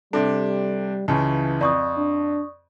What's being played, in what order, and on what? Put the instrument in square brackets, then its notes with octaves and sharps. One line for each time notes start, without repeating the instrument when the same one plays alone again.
[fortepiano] C3 D4 [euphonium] G3 [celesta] A4
[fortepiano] C#2 C#3 [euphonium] E3 [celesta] A5
[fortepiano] F2 [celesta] D5 C#6 D#6
[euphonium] D4